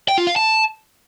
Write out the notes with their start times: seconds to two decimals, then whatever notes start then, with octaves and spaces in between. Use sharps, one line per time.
0.08 G5
0.18 F4
0.27 F5
0.36 A5